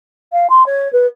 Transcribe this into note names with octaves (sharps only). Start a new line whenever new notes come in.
F5
C6
C#5
B4